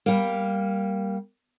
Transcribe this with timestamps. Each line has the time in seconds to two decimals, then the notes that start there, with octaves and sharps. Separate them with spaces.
0.06 G3 A#3